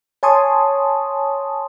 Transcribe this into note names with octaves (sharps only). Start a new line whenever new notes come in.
C#5 G#5 A5 C6 C#6 D#6